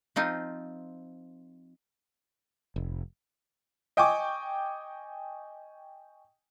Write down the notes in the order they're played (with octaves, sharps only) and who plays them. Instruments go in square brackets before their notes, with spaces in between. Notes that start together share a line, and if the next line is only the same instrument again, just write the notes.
[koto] F3 C4 D#4 F4
[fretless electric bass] F1
[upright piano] D#5 G5 G#5 C#6 D6